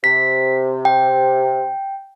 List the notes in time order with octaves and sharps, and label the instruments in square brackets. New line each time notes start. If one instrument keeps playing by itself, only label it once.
[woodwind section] C3 [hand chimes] B6
[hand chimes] G5